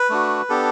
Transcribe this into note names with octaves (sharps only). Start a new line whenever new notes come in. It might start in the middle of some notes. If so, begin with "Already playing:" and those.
Already playing: B4
A3 D4 F#4
B3 D4 G4 A4